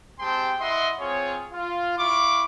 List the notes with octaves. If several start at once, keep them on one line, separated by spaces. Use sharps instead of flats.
G#3 C4 G4 G5 A5 C6
E4 D#5 E5 F#5 C6
C4 F4 G#4 C#5
F4
E4 F5 C#6 D6